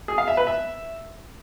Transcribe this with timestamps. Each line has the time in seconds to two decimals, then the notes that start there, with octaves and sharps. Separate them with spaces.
0.08 G#4
0.18 F5
0.28 E5
0.37 B4
0.47 E5